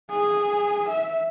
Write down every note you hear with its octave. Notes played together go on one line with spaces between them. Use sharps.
G#4
E5